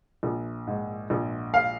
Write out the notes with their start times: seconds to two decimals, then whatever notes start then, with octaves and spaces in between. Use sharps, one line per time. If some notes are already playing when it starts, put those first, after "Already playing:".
0.23 A#1
0.67 G#2
1.10 A#1
1.54 F5